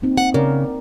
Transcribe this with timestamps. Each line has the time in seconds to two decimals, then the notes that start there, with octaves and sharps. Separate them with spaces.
0.02 A#3 C4 D#4
0.17 F#5
0.34 C#3 A#4 D5